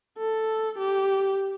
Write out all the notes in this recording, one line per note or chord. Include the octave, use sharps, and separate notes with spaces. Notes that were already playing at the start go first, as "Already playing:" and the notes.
A4
G4